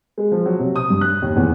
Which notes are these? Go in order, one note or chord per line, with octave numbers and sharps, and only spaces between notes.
G#3
F3
F#3
C3
D#6
G2
F#6
D#2
E2